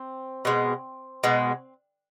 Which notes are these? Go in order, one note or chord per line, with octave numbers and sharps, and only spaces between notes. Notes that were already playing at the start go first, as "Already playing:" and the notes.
Already playing: C4
B2 G#3
B2 G#3